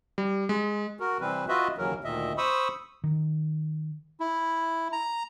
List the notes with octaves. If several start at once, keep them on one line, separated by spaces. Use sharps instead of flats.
G3
G#3
F#4 A#4
C3 E3 G3 C4 B4
F4 F#4 B4 D#5 E5
D#2 C#3 E3 F#3 A#4
D2 A#2 D#3 D#5 E5
C5 B5 C#6 D#6 E6
D#3
E4
A#5